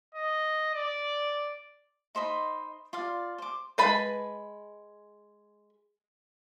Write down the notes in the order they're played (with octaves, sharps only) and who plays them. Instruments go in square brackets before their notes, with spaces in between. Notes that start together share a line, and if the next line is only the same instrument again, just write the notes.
[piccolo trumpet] D#5
D5
[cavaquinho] D#4 C5 D#5 B5
F4 D5 F5
C5 D6
[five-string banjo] G#3 B4 A5 B5